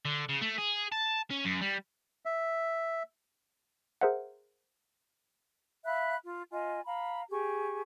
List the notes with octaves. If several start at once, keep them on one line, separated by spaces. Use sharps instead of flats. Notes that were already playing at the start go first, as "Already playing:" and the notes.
D3
C#3
A3
G#4
A5
C#4
F#2
G3
E5
G#4 A#4 C5 E5 F#5
E5 F5 B5 F#6
F4
F4 D#5 G#5
F5 A#5 B5
G4 G#4 C#6